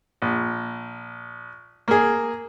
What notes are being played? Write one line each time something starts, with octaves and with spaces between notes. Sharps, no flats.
A#1
A#3 G#4